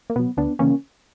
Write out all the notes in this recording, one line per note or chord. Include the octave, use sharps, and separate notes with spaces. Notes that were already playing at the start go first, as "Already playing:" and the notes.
A#3
B2 F#3 B3
D2 B3 D4
C#3 E3 A#3 C#4